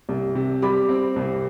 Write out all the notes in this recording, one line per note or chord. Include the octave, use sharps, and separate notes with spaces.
C2
C3
G3 B5 D6
C4
C2